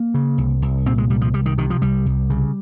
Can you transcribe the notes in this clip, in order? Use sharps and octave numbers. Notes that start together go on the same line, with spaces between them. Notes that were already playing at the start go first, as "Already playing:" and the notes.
Already playing: A#3
C#3
C2
C2
A#2 C4
G#3
C2 G3
F3
C2 G3
D#3
C3 D#3
F3
C2 G3
C2
C#3